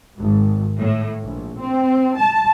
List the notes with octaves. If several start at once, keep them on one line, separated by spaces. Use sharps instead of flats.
G#1
A2
A#1
C4
A5